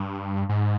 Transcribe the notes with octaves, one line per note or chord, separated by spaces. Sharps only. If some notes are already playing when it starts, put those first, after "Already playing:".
Already playing: G2
G#2